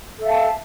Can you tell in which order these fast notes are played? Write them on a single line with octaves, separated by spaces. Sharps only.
A4 E5 F5 A5